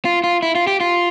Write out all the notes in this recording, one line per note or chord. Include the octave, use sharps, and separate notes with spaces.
F4
F4
E4
F4
G4
F4